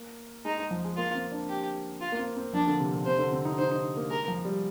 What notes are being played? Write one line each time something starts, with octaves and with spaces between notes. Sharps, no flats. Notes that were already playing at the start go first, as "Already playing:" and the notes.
Already playing: A#3
G#3 D#4
G#3
F3
G#3
A#3 F4
C4
D4
G4
F4
A#3
C4
C4
F3 D4
D3
C3
A#2
C3 C5
D3
C4
D#4
D#4 C5
D#4
A#3
G#3 A#4
F3
G3